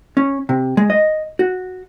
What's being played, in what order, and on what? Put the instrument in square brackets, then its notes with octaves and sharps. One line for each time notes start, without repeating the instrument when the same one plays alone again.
[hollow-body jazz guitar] C#4
C3
G#3
D#5
F#4